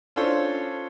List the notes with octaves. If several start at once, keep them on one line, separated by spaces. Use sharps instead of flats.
C#4 D4 F4 A4 C5 C#5